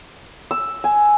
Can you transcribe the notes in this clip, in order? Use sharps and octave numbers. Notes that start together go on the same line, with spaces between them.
E6
G#5